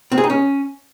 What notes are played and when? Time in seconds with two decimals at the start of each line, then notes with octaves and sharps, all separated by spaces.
0.12 C4
0.18 G#4
0.24 D#4
0.30 C#4